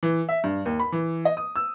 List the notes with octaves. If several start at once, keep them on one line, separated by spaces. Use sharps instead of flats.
E3
E5
G2
D#2
B5
E3
D#5
D#6
E6